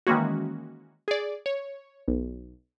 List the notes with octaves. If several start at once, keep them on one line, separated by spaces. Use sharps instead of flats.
D#3 E3 G#3 A#3 C#4 F#4
G#4 D5
C#5
B1